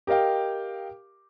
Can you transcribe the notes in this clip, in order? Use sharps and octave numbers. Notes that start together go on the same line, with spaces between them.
G4 A#4 D#5 F5 G5